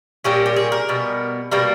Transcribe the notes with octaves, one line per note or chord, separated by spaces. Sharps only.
A#2 G3 A#3 C#4 G4
G4
G#4
A#4
B2 G3 B3
B2 G3 A#3 A#4